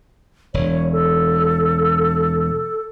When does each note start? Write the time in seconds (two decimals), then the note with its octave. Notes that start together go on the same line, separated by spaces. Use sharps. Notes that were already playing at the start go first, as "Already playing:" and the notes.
0.54 E1 C#5
0.92 A4